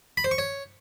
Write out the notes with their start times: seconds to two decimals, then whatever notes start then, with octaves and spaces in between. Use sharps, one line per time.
0.17 B5
0.24 C5
0.31 C#6
0.38 C#5